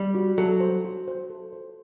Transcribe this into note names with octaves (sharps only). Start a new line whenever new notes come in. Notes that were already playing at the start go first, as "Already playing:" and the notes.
Already playing: G3
F#4
F#3 A4
C5
F#4
C5
A4
C5